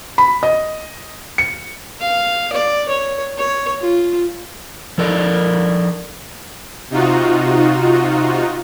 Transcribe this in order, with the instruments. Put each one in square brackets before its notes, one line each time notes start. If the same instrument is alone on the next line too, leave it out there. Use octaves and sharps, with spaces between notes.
[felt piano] B5
D#5
C#7
[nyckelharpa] F5
D5
C#5
C#5
F4
[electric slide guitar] F3 A4 A#4 D5
[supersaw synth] C3 D#4 F4 F#4